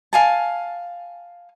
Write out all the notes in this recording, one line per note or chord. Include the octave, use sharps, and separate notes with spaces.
F5 G#5 A5